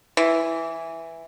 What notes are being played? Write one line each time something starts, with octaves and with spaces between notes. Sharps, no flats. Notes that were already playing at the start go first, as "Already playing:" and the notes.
E3